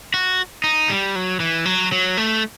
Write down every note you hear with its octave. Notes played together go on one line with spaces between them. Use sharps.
F#4
D#4
G3
F#3
E3
F#3
F#3
A3